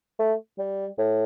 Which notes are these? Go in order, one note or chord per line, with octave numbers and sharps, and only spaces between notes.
A3
G3
A2